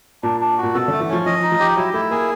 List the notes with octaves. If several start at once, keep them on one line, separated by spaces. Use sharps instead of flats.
A#2 D4
D4
F#4
A#2
B2 A4
D3 A3
E3
F3 C#4
F3 D#5
D#4
F3
G4
F#3 E4
A3 E4
A#3 G#4